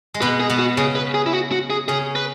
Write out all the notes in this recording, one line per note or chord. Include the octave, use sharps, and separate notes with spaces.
G#3
B2 B3 B4
G#4
B2 B3
F#4
C#3 C#4 G#4
B4
G#4
E4
F#4
F#4
G#4
C#3 C#4 G#4
B4